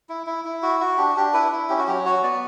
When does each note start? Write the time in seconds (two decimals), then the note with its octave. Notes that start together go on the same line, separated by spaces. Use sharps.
0.09 E4
0.27 E4
0.45 E4
0.62 F#4
0.80 F#4
0.98 D4 G4
1.16 D4 G4
1.34 E4 B4
1.52 E4
1.69 C#4 G4
1.79 F#4
1.87 F#3 G4
2.05 F#4 C#5
2.23 B3 D5